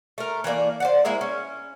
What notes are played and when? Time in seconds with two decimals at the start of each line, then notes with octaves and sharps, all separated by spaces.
0.18 A3 A#4
0.44 E3 A3 A#3 D5
0.80 C5 D5 F#5
1.05 G#3 A#3 E4 G#4
1.21 C#4